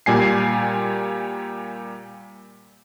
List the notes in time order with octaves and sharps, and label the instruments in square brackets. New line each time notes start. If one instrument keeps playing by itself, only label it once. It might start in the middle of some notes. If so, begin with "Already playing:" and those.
[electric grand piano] A#2 G3 G#5 C7